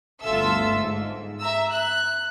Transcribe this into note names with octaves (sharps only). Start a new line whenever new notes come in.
G1 D2 F4 A4 E5 E6
G#2
E5 A#5 E6
F#6